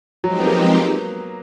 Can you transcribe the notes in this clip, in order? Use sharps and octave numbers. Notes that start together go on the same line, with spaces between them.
F3 F#3 G#3 C4 D#4 G4
B3
A#3